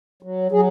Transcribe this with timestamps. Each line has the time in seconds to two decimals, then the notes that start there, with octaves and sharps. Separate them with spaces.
0.23 F#3
0.52 F#3 G#4